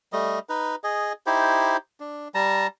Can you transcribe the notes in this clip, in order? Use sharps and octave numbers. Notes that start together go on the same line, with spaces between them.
G3 A3 D#5
D#4 B4
G#4 D#5
D#4 E4 G4 C5
D4
G3 A5 A#5